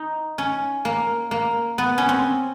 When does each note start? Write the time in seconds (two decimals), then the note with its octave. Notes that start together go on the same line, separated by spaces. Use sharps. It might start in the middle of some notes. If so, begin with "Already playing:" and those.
Already playing: D#4
0.38 C#4
0.85 A#3
1.31 A#3
1.78 B3
1.98 C#4
2.09 C4